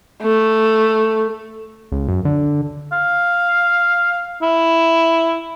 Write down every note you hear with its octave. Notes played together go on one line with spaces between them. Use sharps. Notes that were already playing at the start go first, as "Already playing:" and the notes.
A3
C#2
F#2
D3
F5
E4